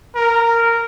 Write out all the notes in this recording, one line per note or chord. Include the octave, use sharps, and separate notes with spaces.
A#4